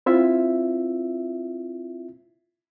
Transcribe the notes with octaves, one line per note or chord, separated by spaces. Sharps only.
C4 E4 F4 E5